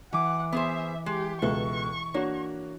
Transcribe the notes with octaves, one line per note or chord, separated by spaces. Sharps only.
E3 F#5 D6
B3 G#4 C5 E5
G#3 G4
C#2 B2 A4 E5 C#6
A#3 D4 F#4 C#5